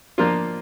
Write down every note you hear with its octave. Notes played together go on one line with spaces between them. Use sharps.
F3 A#3 D4 F4